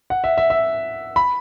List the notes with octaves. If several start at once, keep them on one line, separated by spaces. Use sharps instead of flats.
F#5
E5
E5
E5
B5